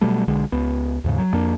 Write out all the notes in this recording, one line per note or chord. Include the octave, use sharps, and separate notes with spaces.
B2 F#3 G3 A3
B1 D3 G#3
C#2 B3
D#2 G#2 C#3
F#3
F2 A#3 D4